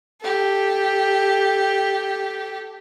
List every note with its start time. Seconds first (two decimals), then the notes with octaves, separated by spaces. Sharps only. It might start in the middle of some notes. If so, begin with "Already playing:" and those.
0.21 G4 A4